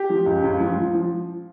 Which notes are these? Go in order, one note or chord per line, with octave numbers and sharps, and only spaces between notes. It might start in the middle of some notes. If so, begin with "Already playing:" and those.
Already playing: G4
F3
C#2
C#2
F3
F3
F3